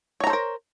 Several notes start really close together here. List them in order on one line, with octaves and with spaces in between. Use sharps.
C#5 A#5 A4 C5 A#4